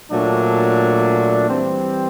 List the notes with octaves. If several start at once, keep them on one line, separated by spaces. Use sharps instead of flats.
A#2 F#3 A3 D4
E3 G3 C4